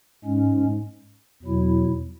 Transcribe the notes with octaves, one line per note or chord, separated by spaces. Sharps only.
G#2 G#3 C#4
E2 B2 F#3 E4